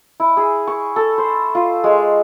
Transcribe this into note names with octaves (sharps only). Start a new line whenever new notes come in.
E4
G#4
C#6
A4
C5
F4
G#3